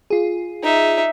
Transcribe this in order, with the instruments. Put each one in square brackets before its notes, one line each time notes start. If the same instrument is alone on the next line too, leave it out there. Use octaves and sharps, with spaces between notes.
[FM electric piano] F4 G#4
[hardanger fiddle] D#4 E5